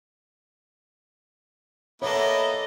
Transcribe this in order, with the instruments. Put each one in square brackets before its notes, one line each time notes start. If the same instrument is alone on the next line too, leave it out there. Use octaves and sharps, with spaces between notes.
[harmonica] A#3 B3 E4 [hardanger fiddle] A4 D#5 [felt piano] C#5